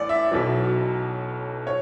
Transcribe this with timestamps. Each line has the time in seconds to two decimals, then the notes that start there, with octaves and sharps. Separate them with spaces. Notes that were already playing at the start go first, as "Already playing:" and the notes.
Already playing: A1 D5
0.09 E5
0.32 B1 B2 F#3
1.67 C#5